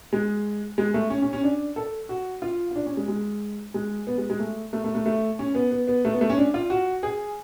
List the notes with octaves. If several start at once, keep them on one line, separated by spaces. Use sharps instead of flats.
G#3
G#3
A3
C#4
C#4
C#4
D4
A4
F#4
F4
F4
D4
C#4
G#3
G#3
G#3
B3
G#3
G#3
A3
A3
A3
A3
A3
C#4
B3
B3
B3
A3
B3
A3
C#4
D4
F4
F#4
G#4